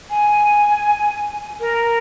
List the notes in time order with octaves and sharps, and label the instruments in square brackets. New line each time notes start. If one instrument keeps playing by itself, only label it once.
[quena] G#5
A#4